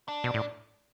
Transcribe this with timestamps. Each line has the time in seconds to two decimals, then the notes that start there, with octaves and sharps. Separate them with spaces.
0.08 D4
0.24 B2
0.34 A2